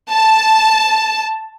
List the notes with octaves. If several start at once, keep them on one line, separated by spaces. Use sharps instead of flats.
A5